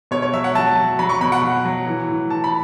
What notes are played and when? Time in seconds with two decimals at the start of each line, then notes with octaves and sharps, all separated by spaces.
0.11 B2 C#5
0.22 C#5
0.33 F#3 E5
0.44 F#5
0.55 F#3 A5
0.77 F#3
0.99 F#3 B5
1.09 C#6
1.21 B2 B5
1.32 F#5
1.43 F#3
1.65 F#3
1.86 E3
2.08 A2
2.30 E3 A5
2.44 B5